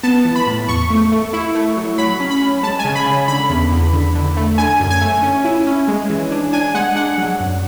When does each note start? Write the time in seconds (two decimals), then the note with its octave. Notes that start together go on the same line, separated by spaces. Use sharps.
0.03 B3 A5
0.25 E3
0.36 B5
0.47 A2
0.68 E2 C#6
0.90 A3
1.12 A3
1.33 E4
1.55 A3
1.77 F#3
1.98 F#3 B5
2.20 C#4
2.31 B5
2.41 C#4
2.63 G#3 A5
2.79 G#5
2.85 C#3
2.95 B5
3.06 C#3
3.28 D3 B5
3.50 E2
3.71 E2
3.93 D3
4.15 D3
4.37 A3
4.58 D3 G#5
4.80 F#2
4.90 G#5
5.01 A3
5.23 C#4
5.44 E4
5.66 C#4
5.88 G#3
6.10 E3
6.31 D4
6.53 D4 G#5
6.74 G#3 F#5
6.96 D4 F#5
7.18 F#3
7.40 F#2